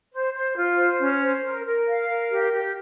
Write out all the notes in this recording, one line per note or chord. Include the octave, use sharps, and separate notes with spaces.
C5
C5
F4
C5
C#4
C5
A#4
A#4
F5
A#4
G4
G4